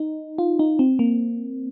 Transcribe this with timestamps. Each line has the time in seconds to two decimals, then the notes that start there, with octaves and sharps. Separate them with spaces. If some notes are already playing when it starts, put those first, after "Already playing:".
Already playing: D#4
0.38 F4
0.59 D#4
0.79 C4
0.99 A#3